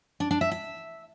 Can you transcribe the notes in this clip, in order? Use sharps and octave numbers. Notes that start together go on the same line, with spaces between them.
D4
D4
E5
E5